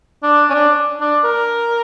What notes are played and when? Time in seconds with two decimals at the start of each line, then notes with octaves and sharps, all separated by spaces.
0.23 D4
0.50 C#4
0.54 D4
1.01 D4
1.24 A#4